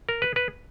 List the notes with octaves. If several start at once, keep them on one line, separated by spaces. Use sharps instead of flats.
A#4
B4
B4